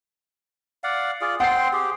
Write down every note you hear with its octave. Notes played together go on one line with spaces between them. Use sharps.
D5 F5 F#5
F4 G#4 D5
C4 F#5 G5 C6 C7
G4 G#4